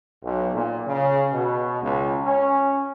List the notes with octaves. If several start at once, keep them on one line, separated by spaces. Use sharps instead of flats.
B1
A#2
C#3
B2
C#2
C#4